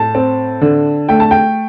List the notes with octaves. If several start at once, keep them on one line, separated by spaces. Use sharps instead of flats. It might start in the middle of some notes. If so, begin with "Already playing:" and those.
Already playing: A2 A5
C4
D3
A3 G5
A5
G5